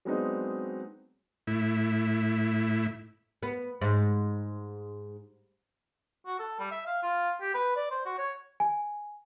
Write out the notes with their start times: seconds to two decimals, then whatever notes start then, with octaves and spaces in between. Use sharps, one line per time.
0.05 F#3 G#3 B3 C4 D4 D#4
1.47 A2 E4
3.43 B3
3.81 G#2
6.27 F#4
6.39 A4
6.59 G3
6.71 E5
6.87 F5
7.03 F4
7.41 G4
7.54 B4
7.76 D5
7.91 C5
8.06 F#4
8.18 C#5
8.60 G#5